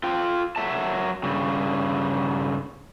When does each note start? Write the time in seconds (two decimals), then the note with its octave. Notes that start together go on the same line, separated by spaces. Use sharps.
0.04 F4 G5
0.56 F#3 E5 A5
1.23 G2 C#3